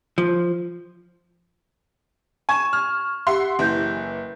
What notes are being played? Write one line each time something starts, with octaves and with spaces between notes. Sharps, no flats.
F3
G#5 C#6 G#6 E7
F6
G4 E5 F#5 C6
F#1 E3 E5 G6